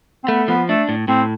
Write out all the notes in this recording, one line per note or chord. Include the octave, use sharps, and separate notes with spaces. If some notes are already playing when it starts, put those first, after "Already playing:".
C4
A3 B3
F3 B3
A3 D4
A2
A2 C4